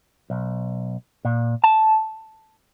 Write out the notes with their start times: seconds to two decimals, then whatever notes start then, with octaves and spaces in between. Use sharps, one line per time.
0.30 B1
1.25 A#2
1.64 A5